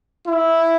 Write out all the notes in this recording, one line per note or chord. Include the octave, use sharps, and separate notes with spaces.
E4